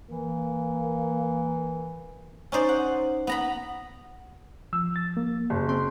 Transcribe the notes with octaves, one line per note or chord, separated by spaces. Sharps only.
E3 A#3
C#4 D#4 C5 D5
F#5
B3 A#5 B5
F3 E6
A6
A#3
F#1
C4 C6